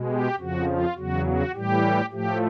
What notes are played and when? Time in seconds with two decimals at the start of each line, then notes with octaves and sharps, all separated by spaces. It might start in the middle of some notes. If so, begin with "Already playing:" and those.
Already playing: B2 G#3
0.10 G4
0.39 F2 C#3 F3 F#4
0.68 F4
0.96 E2 C#3 F#3 F#4
1.26 F#4
1.54 A2 E3 G3 G4
2.11 A2 F3 A3 G4